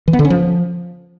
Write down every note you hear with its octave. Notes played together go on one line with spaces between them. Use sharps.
E3
B3
D3
C#4
F3